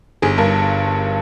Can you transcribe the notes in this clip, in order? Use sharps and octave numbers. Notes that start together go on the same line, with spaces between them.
G1 G#4
G2 A#4